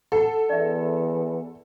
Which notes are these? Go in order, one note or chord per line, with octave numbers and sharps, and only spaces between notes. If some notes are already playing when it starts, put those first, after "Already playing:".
A4 F#5
E2 D5 E5